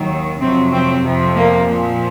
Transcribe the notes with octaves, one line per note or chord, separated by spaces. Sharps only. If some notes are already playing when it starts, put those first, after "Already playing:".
Already playing: D#2 D#3 F#3
F2 C3 F#3 C4
C4
F2 C3 F3
A#3
A#2 F3